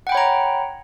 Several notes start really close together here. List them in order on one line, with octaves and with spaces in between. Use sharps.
F#5 G5 B5 C#5 A#5